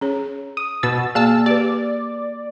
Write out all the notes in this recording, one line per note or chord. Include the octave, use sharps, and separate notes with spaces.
C#4 G#4 C#5
D#6
B2 E6 A6
A#3 G#4 D5 F5 A5 E6
G4 B4 D5